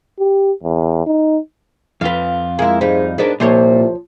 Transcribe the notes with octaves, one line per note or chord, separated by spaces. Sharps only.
G4
E2
D#4
F2 F4 B4 F5
G#3 A#3 E4
G#2 G3 D#4
G#2 B3 D4 A#4
C2 A#2 F3 C5 C#5